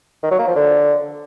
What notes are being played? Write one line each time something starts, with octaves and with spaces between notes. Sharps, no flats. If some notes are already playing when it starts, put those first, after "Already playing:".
D#3
F#3
A#3
F3
D3